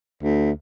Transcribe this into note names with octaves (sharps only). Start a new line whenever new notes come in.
D2